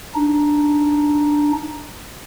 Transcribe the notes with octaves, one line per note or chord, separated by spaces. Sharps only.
D4 D#4